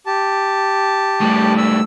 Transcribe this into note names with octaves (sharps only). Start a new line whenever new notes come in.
G4 A5
A2 G3
E6